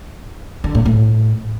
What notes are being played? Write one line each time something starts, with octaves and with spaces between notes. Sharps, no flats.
D3
A2
A2